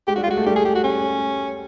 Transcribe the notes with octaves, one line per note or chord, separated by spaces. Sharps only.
G#3 G4
G3 F#4
F4
G#3
F#4
A3
G3 G4
G#4
G4
F#4
C#4